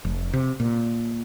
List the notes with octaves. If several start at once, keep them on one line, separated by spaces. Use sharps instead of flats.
F1
C3
A#2